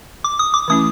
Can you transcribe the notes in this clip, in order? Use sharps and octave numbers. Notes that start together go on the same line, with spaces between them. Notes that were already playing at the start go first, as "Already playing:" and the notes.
D6
D#6
D6
E3 A3 C#4 E4 D#6